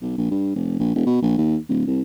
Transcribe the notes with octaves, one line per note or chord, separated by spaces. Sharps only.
B1
A#1
G2
F1
A#1
E1
B2
A#1
D#2
D1
C2